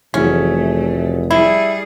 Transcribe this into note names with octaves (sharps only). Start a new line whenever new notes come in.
F1 E3 F#3 A3 C#4 G#4
G3 E4 G#4